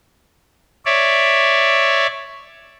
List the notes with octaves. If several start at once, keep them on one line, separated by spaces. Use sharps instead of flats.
C#5 D5 E5